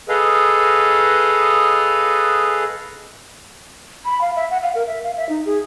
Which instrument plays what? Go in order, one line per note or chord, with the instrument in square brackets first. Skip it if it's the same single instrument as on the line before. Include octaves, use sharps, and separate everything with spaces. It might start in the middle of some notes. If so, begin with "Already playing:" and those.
[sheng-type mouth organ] G#4 A4 B4 D#5 F5
[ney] B5
F5
E5
F#5
F5
A#4
E5
F5
E5
D#4
G#4